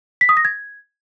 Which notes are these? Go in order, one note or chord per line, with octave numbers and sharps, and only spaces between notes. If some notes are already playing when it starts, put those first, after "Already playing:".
B6
D#6
A#6
G#6